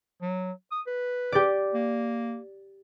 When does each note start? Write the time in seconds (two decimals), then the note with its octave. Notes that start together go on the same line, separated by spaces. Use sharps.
0.21 F#3
0.72 D#6
0.87 B4
1.32 G4 D5
1.75 A#3